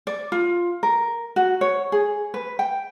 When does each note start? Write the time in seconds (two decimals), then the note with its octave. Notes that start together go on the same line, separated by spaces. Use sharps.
0.07 D5
0.32 F4
0.83 A#4
1.36 F#4
1.61 C#5
1.92 G#4
2.34 B4
2.59 G5